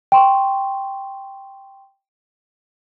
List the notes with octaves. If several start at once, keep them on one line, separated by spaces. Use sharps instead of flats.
G5 C6 C#6